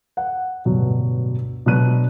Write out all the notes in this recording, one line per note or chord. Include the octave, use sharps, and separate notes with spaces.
F#5
D1 G2 B2 F#3
B2 F#3 D4 F#4 F#6 D#7